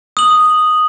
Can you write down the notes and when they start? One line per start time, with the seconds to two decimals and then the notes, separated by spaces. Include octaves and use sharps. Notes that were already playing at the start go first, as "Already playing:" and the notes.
0.17 D#6 F#7